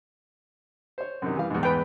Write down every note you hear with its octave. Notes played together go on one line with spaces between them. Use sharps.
C5 C#5
F#2 C3 D#3
E3 G3 F5
E2 G#2
B4 G5